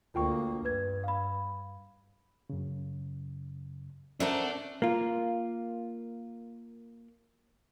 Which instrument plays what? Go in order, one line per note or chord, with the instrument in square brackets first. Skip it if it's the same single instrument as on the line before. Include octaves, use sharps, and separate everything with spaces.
[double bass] D2 A#3 [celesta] F4 G5 C#6
[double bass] G2 [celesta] B4 G#6
[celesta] F5 B5
[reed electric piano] F#2 C#3
[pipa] A3 A#4 [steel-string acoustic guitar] C#4 C5 F#5 [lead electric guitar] D4
[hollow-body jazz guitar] A#3 F4